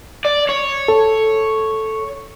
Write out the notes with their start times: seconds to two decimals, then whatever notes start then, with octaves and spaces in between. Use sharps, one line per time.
0.25 D5
0.49 C#5
0.88 A4